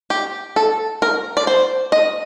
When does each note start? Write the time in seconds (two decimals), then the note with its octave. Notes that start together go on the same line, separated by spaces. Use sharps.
0.10 G4
0.56 A4
1.02 A#4
1.37 D5
1.47 C5
1.92 D#5